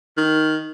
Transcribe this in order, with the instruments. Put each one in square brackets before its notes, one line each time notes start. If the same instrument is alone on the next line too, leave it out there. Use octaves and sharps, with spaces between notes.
[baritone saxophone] D#3